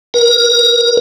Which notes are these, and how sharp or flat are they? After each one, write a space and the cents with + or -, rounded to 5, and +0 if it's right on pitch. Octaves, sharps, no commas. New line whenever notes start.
A#4 +30